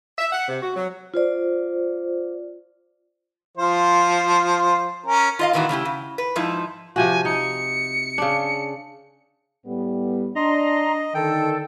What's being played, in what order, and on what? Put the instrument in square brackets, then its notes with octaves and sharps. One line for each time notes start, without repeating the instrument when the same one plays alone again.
[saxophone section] E5
F#5
C3
F#4
F#3
[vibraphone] F4 C5 D5
[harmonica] F3 F4 C5
C#4 A#4
[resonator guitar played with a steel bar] F4 D#5 F5
A#2 D#3 E3 E4 F#4
C#3 A3 E4 G4
C#3
B4
G#2 F3 D#4 E4
[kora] C3 F3 F#4 [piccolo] G#5
[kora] D#4 [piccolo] C#7
[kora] C#3 D4
[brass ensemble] A2 G3 B3
[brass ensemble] D4 [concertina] D#5 [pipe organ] A#5 C6
[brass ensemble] D3 D#3 [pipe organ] A4 [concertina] G5